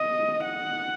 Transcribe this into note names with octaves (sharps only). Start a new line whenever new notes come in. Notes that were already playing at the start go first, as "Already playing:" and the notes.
Already playing: D#5
F#5